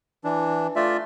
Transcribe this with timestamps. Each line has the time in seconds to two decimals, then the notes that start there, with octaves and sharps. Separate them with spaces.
0.24 E3 D4
0.76 A3 F4 D5 E5